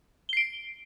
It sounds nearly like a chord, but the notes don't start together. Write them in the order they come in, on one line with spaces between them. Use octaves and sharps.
G7 C7 D7